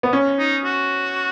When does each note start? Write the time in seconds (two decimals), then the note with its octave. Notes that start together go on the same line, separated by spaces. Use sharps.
0.03 B3
0.13 C#4
0.39 D#4
0.64 F#4